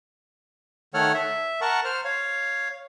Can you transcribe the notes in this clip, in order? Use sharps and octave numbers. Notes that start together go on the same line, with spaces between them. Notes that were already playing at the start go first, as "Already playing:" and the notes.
D#3 A3 A4 C#5 F#5 F6
E5
A#4 F#5 A5 C#6
C5 F6
C#5 F5